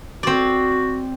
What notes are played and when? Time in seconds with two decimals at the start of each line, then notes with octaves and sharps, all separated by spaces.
0.23 C4 F#4 D5